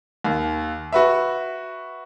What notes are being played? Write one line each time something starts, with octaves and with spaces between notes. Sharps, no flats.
D#2
F#4 B4 E5